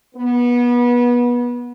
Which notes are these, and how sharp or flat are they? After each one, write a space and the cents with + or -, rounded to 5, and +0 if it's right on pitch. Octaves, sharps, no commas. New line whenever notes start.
B3 -25